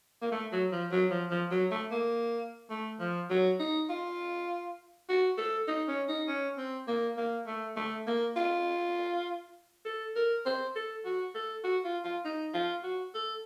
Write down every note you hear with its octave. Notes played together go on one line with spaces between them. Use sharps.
A#3
A3
F#3
F3
F#3
F3
F3
F#3
A3
A#3
A3
F3
F#3
D#4
F4
F#4
A4
D#4
C#4
D#4
C#4
C4
A#3
A#3
A3
A3
A#3
F4
A4
A#4
C5
A4
F#4
A4
F#4
F4
F4
D#4
F4
F#4
A4